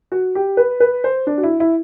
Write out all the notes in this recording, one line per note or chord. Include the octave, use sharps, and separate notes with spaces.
F#4
G4
B4
B4
C5
D4
F#4
E4
E4